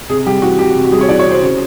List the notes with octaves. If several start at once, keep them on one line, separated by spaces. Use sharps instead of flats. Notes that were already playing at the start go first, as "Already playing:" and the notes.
C3 G#4
G3 G4
E3 F#4
C3 G4
C3
F#4
G3 G#4
C#5
E3 D5
C#5
C3
C5
C#3